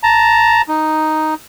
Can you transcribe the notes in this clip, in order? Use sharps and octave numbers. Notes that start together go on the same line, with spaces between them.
A5 A#5
D#4